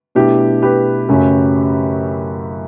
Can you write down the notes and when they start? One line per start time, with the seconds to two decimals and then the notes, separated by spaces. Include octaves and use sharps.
0.15 B2 A3 D4 E4 G4
0.62 G4 B4
1.09 F#2 C#3 F#3 A3 C#4